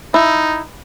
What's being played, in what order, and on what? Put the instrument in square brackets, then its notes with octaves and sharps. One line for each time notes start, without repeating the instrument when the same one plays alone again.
[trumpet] D#4 [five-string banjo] E4